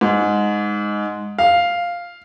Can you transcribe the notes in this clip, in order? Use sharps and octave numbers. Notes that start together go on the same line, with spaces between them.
G#2
F5